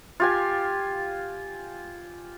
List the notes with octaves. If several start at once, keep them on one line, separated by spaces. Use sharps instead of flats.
F4 G4 G#5